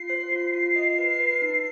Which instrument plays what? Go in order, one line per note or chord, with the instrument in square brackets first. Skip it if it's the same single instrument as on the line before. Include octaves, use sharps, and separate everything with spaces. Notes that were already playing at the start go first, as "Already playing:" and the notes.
Already playing: [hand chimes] F4 [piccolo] C7
[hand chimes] C5
F4
F4
D#5
B4
B4
D#4